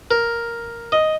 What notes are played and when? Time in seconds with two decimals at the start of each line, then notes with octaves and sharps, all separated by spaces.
0.11 A#4
0.92 D#5